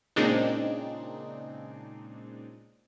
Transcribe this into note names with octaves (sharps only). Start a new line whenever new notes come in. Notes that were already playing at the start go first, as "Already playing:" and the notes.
A#2 C#3 G#3 C4 D4 D#4